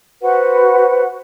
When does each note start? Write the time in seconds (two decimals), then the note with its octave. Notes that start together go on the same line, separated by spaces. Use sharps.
0.22 F#4 B4 C5 F#5